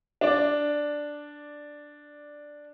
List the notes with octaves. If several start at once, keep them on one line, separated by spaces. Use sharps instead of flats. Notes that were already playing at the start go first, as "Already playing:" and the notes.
D4 D5